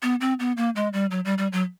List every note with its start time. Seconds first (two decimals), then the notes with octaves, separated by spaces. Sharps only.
0.03 B3
0.21 C4
0.40 B3
0.57 A#3
0.76 G#3
0.93 G3
1.11 F#3
1.25 G3
1.38 G3
1.53 F#3